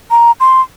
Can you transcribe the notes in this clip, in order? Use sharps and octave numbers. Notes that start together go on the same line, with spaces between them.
A#5
C6